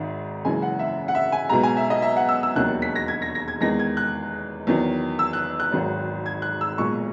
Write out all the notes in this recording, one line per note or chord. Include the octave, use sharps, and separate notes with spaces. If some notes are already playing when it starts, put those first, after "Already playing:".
Already playing: G#1 G#2 D#3 E5
F#1 F#2 C#3 E3 G#3 G#5
F#5
E5
F#5
E5
G#5
B1 B2 G#3 A#5
G#5
E5
D#5
E5
F#5
E6
E6
E1 D#2 D#3 F#3 F#6
B6
A#6
G#6
A#6
A#6
G#6
E2 D#3 G#3 A#6
G#6
F#6
E2 D#3 F#3
E6
F#6
F#6
G#1 G#2 D#3 F#3
G#6
F#6
E6
B1 A#2 G#3 C#6